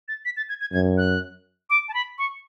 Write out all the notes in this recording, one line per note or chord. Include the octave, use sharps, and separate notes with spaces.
A6
B6
A6
G#6
G#6
F#2 G#6
F#6
D6
A5
B5
C#6